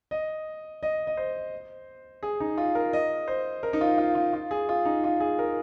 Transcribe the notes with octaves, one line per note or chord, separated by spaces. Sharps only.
D#5
D#5
D#5
C5
G#4
D#4
F4
A#4
D#5
C5
A#4
D#4
F4
F4
F4
F4
G#4
F4
D#4
F4
G#4
A#4